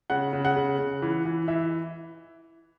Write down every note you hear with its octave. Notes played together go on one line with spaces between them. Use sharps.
C#3 F#5
C#3
F#5
C#3
C#3
E3
E3
E3 E5